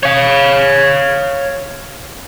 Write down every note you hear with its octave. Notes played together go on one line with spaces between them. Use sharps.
C#5 F5